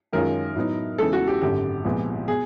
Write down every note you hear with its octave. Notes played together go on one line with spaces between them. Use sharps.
F#2 D#3 G#3 C#4 F4 A#4
A2 F#3 B3 D#4
E2 C#3 E3 G#3 A4
F#4
G4
G#1 F#2 D3 G4
C2 A#2 F3 G#3 B3
B2 G#4